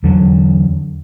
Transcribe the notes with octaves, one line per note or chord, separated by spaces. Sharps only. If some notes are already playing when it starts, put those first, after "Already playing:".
E2 D3 F#3